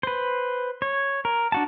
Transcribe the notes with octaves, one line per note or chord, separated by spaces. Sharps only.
B4 C5
C#5
A#4
D4 F#4 A5